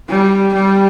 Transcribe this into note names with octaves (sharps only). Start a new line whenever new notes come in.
G3
G3